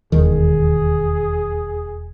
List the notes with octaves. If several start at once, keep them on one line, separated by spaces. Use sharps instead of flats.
E1 D#2 D#3 G#4